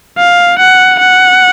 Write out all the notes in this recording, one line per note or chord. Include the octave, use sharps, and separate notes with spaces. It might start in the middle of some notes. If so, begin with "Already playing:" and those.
F5
F#5
F#5